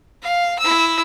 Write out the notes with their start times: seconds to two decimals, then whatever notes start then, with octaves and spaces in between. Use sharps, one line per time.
0.22 F5
0.59 E4 E6